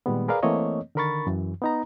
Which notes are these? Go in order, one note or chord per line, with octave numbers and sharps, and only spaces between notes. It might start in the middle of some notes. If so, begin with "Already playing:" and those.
A#2 D#3 G3 G#3 B3
G#4 A#4 B4 D5 F5 A#5
E3 A3 A#3 C4 C#5 D#5
D3 D#3 A#4 B5 C#6 A6
F#2 E3
B3 D#4 A#5